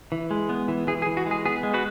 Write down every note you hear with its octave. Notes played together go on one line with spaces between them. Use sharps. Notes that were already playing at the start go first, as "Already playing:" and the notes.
E3
G#3
B3
E3
E3 G#4
G#4
E3
F#4
G#3 G#4
B3 G#4
G#3
F#4 B4